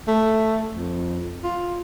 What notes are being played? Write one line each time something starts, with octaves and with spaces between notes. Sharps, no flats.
A3
F2
F4